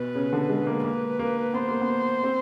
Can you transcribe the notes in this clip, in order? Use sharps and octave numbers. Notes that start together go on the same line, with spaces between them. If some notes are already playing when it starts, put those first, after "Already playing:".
Already playing: B2 B4
C#3
D3
G#3
A#3
A#3 B4
A#3
B3 C5
A#3
B3
C4